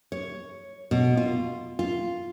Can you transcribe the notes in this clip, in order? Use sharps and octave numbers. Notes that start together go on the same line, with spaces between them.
C#5
B2
F4
F4